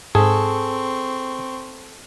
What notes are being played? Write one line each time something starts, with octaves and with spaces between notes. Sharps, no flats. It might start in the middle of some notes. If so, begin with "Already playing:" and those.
G#2 C4 G#4 A4 C#6